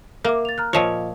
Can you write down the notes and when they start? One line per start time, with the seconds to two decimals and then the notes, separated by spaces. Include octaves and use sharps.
0.24 A#3 A#4 E5 D6
0.45 A6 F7
0.58 A#5 F6 F#6
0.73 A#2 F3 F4 C#5 D#5